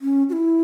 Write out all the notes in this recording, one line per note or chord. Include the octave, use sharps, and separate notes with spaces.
C#4
F#4
E4